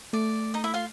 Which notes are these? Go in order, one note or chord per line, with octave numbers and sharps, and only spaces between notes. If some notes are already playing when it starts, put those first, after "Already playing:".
A3 D5
D#4 D#5
E4 E5
F4 F5